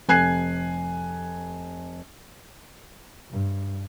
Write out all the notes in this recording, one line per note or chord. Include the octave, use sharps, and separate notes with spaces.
F1 G#5 F#6 G#6 C7
G2